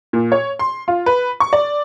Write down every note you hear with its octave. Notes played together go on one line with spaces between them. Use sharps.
A#2
C#5
C6
F4
B4
C#6
D5